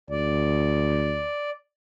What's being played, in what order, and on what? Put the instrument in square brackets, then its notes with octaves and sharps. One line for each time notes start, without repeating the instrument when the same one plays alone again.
[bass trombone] D2 [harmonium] D5